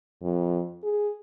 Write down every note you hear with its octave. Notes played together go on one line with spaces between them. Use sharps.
F2
G#4